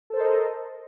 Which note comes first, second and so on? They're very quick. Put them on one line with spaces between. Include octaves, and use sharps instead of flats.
A4 C5 A#4 D#5